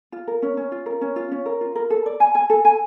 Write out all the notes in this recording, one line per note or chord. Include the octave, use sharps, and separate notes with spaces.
F4
A#4
C#4
C#4
F4
A#4
C#4
F4
C#4
A#4
F4
A#4
A4
D5
G#5
G#5
A4
G#5